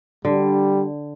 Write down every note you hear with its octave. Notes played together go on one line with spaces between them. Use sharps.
D3 G3